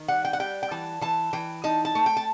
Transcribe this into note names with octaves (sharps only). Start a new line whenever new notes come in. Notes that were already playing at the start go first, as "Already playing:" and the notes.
Already playing: D#3
G3 F#5
G5
F#5
G3 G5
G5
E3 A5
E3 A5
E3 G5
D#4 A5
A5
A3
G5
A5